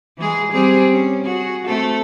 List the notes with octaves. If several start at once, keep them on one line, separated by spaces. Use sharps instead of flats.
E3 G#3 G#4
G3 C4 G#4
C#4
F#4 G#4
A3 C4 A4